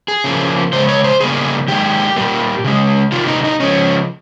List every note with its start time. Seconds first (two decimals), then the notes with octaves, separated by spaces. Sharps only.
0.08 G#4
0.24 C#3 F3 A#3
0.73 C#3 G#3 C5
0.89 C#5
1.04 C5
1.20 C#3 G3 A#3 G#4
1.68 D#3 G#3 G4
2.16 A#2 G3 A#3
2.64 C#3 G#3
3.12 C3 D#3 G3 A#3 F4
3.28 D#4
3.44 D#4
3.60 C#3 F3 G#3 C#4